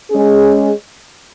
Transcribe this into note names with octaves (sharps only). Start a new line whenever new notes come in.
G#3 C#4 G#4